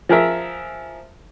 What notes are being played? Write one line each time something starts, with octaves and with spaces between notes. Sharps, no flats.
F3 G#4 A#4 E5